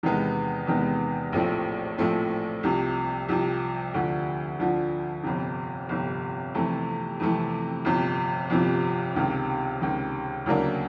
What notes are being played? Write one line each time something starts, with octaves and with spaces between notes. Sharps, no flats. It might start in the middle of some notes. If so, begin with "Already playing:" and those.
E2 C3 D#3 G#3 B3
E2 C3 D#3 G#3 B3
A#1 A2 F3 A3 C4
A#1 A2 F3 A3 C4
C2 C3 F3
C2 C3 F3
D2 D3 F3
D2 D3 F3
G1 F2 C3
G1 F2 C3
F2 C3 E3 A3
F2 C3 E3 A3
G1 F2 C3 F3
G1 F2 C3 F3
C#2 C3 D#3
C#2 C3 D#3
D2 C#3 F#3 A#3 D4